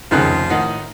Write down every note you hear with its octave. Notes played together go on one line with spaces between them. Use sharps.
F1 C#2 D#3 F3 G#4 F#6
A2 D#3 D#4 F#5